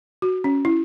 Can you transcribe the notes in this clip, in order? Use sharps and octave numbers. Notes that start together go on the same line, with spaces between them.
F#4
C#4
E4